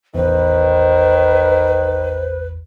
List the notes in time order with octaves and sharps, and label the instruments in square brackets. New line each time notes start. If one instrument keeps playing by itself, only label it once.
[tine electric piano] A1 E2 [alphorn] D#3 [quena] B4 [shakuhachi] C5